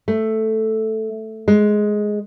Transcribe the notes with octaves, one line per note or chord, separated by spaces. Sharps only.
A3
G#3